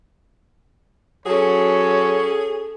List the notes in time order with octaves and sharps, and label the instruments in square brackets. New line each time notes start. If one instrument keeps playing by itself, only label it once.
[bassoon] F#3 [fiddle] C#4 A4 [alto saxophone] G#4 [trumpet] C#5